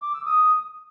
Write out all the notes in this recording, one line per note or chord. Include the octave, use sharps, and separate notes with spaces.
D6
E6
D#6